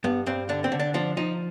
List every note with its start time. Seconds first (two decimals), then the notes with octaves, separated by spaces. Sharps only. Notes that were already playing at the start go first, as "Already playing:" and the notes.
0.04 G2 B3
0.26 G2 C4
0.49 D3 D4
0.64 C4
0.72 D3
0.80 D4
0.94 F3 D4
1.17 F3 D#4